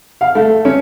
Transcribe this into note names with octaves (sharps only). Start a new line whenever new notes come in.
F5
A3
C#4